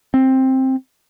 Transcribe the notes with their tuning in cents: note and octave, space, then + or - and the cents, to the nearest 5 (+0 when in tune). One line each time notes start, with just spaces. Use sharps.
C4 +10